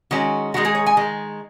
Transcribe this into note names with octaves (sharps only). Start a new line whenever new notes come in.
D#3 G#3 C#4 F#4
D#3 G#3 D#4 F#4
G#4
C#5
G#5
D#3 G#3